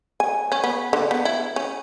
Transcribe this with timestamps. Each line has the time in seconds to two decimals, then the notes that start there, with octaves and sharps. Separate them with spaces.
0.20 G#5
0.52 C#4
0.64 B3
0.93 D3
1.11 B3
1.25 E4
1.56 C#4